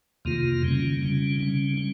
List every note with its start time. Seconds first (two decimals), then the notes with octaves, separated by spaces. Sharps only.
0.25 F2 C3 D#3 A#3 F4
0.62 C#3 G3 C#4
1.01 C#3 G3 C#4
1.40 C#3 G3 C#4
1.77 C#4